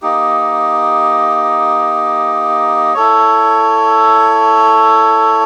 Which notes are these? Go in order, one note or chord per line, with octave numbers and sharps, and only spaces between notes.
A#3 D#4 G4
E4 A4 C#5